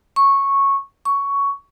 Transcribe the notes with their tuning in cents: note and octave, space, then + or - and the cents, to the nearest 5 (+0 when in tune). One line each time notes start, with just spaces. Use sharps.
C#6 -10
C#6 +10